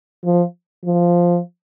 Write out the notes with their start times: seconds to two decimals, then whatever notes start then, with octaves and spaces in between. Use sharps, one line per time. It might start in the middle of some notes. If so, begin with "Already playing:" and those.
0.25 F3
0.85 F3